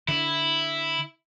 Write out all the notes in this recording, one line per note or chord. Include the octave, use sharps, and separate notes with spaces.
D3 E4